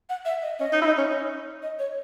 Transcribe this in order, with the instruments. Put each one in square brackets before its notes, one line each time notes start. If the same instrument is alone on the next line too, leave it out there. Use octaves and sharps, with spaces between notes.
[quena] F#5
E5
D#5
[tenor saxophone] C#4 [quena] D#5
[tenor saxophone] D#4
E4
D#4
C#4
[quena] D#5
C#5